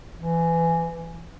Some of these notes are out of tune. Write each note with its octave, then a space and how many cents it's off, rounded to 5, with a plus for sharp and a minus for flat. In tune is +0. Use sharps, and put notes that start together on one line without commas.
E3 +20